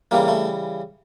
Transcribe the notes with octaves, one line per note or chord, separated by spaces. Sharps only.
C#3 E3 G3 A#3
A3